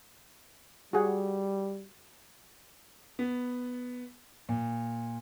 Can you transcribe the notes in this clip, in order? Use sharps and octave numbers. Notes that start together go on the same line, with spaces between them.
G3 F#4 G#4 F#5
B3
A#2